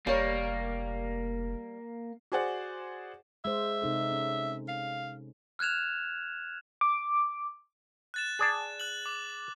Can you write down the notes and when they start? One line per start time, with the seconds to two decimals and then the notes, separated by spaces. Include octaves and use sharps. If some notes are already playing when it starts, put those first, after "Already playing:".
0.07 F1 G3 A#3 C#5
2.32 F#4 G#4 C5 D5 F#5
3.45 G#3 C5 E5
3.82 C3 D#4 A4
4.12 C#4
4.69 F5
5.59 F6 F#6 G#6 E7 F7
6.81 D6
8.14 F#6 A6 E7
8.39 G#4 D5 A5
8.80 F#6 F#7
9.06 D6